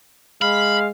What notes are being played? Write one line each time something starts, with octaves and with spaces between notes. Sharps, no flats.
G#3 F5 B5